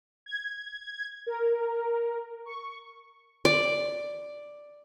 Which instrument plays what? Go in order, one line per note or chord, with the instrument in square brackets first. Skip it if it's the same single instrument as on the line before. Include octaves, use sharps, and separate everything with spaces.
[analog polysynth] G#6
A#4
C#6
[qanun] D5